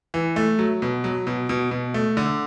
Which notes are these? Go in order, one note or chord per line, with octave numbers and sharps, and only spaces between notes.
E3
A3
F#3
B2
F#3
B2
B2
B2
A3
D3